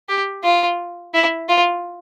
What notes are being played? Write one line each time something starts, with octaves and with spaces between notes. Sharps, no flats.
G4
F4
E4
F4